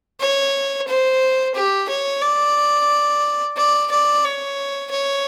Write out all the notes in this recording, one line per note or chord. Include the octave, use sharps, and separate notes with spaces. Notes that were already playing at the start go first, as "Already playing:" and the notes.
C#5
C5
G4
C#5
D5
D5
D5
C#5
C#5